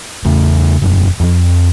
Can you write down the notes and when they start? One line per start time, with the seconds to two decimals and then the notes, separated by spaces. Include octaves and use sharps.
0.25 E2 C#3 A3
0.82 E1 F#2 F#3
1.20 F2 F3